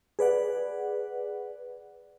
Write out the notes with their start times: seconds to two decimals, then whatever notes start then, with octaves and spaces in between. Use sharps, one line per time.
0.19 G#4 B4 D5 F#5